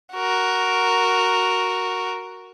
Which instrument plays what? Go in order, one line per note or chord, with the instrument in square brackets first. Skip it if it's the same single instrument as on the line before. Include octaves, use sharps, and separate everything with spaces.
[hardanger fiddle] F#4 A#4